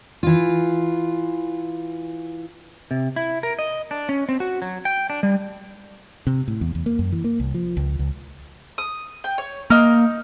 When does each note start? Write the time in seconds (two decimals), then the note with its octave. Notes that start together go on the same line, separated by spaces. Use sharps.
0.23 E3 F4
2.91 C3
3.16 E4
3.43 A#4
3.59 D#5
3.91 D4
4.09 C#4
4.29 C4
4.40 F#4
4.62 F#3
4.85 G5
5.10 D4
5.23 G3
6.27 C3
6.48 A2
6.61 E2
6.75 E2
6.86 A#3
6.99 F#2
7.12 E3
7.24 A#3
7.40 C2
7.54 F3
7.77 C#2
7.99 C#2
8.78 D#6
9.24 G5
9.38 C#5
9.70 A#3 D#4 F6